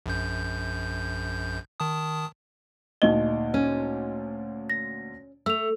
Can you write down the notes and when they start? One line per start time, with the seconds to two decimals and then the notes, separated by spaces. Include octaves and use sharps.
0.06 A#1 F#2 G6
1.80 D#3 A5 D#6
3.02 D2 A#2 D#4 D#5 G7
3.54 C#4
4.70 A#6
5.46 A3 E6 F7